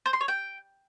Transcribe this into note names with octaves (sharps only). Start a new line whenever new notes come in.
C5
C6
C#5
G5